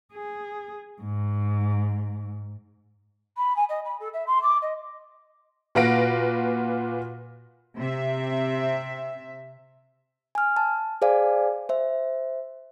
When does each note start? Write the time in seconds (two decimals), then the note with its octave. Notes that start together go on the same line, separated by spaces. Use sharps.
0.14 G#4
1.01 G#2
3.36 B5
3.56 G#5
3.69 D#5
3.84 B5
3.99 A4
4.13 E5
4.26 C6
4.42 D6
4.62 D#5
5.75 A#2 F#4 B4 F5 A#6 D7
7.77 C3 E5
10.35 G#5 F6
10.57 A5
11.02 G#4 C5 D5 F5 G#5
11.69 C5 E5